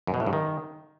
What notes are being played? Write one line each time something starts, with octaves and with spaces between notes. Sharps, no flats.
F#2
B2
A2
G2
D#3